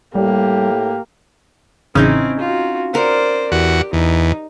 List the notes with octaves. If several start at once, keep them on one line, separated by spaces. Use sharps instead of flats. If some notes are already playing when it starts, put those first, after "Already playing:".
A2 G3 A#3 G4
A1 C#3 C4 C#4 D#4 E4
F4 F#4
A#4 C5 D5 F#5
E2 F#4 G4
E2 D#4